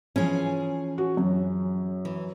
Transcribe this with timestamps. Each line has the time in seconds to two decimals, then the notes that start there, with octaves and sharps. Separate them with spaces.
0.16 E3 F3 C#4 G#4
0.98 F#4
1.17 F#2
2.05 E3